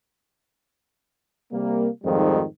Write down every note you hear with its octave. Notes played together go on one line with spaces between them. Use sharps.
C3 G3 A#3
F2 G#2 D#3 F3 G3